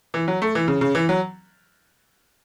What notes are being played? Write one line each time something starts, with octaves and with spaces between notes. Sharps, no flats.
E3
F#3
A3
E3
C#3
C#3
E3
F#3